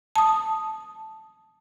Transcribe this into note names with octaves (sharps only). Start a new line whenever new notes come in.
A5 D#6